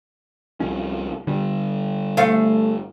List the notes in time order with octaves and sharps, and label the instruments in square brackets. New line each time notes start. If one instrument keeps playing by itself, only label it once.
[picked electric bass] C2 F3 C#4
G1 D3 G3
[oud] A3 F5